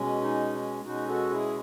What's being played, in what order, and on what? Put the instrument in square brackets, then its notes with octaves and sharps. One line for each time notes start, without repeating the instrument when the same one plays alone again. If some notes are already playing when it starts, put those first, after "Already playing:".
Already playing: [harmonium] B2 G#3 C#4
D#4
B2 G#3 C#4 D#4 F#4
F#4 A4
E4 G#4